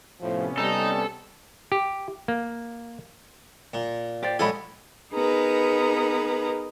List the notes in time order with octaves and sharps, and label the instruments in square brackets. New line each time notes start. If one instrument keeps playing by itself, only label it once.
[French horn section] A2 F3 [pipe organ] C3 B3 C#4
[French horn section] G3 [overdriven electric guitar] D#4 [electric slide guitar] A4
[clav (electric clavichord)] G4
A#3
[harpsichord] A#2
[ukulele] G4 C5 D5
[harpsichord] A#1 G#3 G#5 [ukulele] A4 C#5 B5
[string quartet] B3 D#4 G#4 A#4 B4